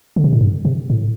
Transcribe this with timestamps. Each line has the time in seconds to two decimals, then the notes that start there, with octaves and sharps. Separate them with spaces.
0.16 D3
0.24 C3
0.33 A2
0.41 G2
0.65 C3
0.90 A2